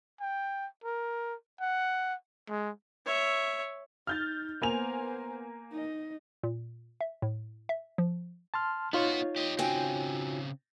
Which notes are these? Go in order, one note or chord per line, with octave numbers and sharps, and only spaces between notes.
G5
A#4
F#5
G#3
C#5 E5
D#4 F6 G6 A6
A#3 B3 C5 G#5 F7
D#4 D#5
A#2
E5
A2
E5
F3
A5 C6 F6
B3 D#4 F4 F#4 C#5
G4 D#5
C#3 C4 F#4 G5 G#5